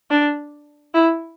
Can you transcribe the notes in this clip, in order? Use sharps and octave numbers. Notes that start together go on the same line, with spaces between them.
D4
E4